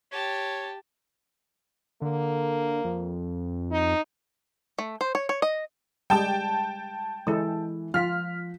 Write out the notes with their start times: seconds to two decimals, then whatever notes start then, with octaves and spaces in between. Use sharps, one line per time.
0.12 G4 C#5 A5
2.02 D3 A#3
2.85 F2
3.71 D#4
4.78 A3
5.01 C5
5.15 C#5
5.29 C#5
5.42 D#5
6.10 G3 G#3 G5 A5
7.27 E3 G#3 A4
7.94 F3 F4 F6 B6